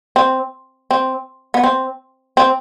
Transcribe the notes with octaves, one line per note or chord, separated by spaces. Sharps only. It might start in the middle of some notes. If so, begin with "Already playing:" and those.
C4
C4
B3
C4
C4